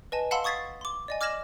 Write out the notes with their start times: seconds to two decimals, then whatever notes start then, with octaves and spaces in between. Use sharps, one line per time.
0.12 B4 D#5 G#5 A5
0.31 F5 F#5 A5 B5 C6 E6
0.44 C#6 D#6 G#6 A6 B6 C7
0.81 C6 D6
1.08 D5 D#5 G#5
1.21 D6 F6 G#6 A#6 E7 F#7